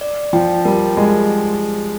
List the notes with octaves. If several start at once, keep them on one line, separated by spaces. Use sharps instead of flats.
D5
F3 G5
G3 A#4
G#3 F#4